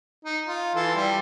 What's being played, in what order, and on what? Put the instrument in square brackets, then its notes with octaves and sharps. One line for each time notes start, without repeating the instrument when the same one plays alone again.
[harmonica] D#4
F4
E3 A4 C6
G3